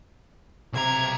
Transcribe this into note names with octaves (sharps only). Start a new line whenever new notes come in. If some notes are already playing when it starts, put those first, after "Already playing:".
B1 C3 A#5 G#6